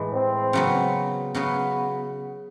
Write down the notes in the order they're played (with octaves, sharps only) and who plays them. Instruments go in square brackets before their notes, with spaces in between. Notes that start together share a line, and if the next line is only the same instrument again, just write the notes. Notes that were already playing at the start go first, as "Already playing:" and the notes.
Already playing: [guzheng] A2 E3 G#3
[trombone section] C4
[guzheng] C#3 F#3 B3
C#3 F#3 B3